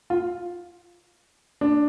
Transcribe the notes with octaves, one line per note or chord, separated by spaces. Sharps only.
F4
D4